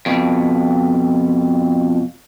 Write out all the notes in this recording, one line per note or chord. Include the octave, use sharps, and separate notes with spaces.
F2 B2